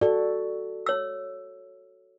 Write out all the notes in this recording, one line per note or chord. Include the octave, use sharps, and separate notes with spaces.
F#4 A4 D5
C#5 E6